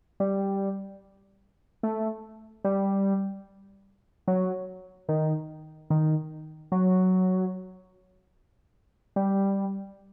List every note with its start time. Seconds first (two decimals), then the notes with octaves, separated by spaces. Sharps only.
0.20 G3
1.83 A3
2.64 G3
4.28 F#3
5.09 D#3
5.90 D#3
6.72 F#3
9.16 G3